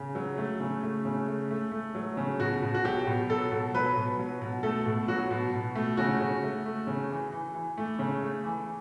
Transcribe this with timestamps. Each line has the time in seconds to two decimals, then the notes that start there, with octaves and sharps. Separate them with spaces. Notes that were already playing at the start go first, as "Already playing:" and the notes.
Already playing: C#3
0.15 F#3
0.38 A3
0.60 C#3
0.83 A3
1.05 C#3
1.28 A3
1.51 A3
1.72 A3
1.95 F#3
2.17 C#3
2.39 B2 F#4
2.63 B2
2.75 F#4
2.84 F#3 G4
3.07 B2
3.30 F#3 A4
3.52 B2
3.74 F#3 B4
3.97 B2
4.19 F#3
4.42 B2
4.63 A3 A4
4.86 B2
5.08 F#3 F#4
5.31 B2
5.54 B2
5.75 A3
5.97 C#3 F#4
6.21 C#3
6.43 A3
6.66 A3
6.87 C#3
7.10 E3
7.32 E3
7.54 E3
7.78 A3
7.99 C#3
8.22 A3
8.44 E3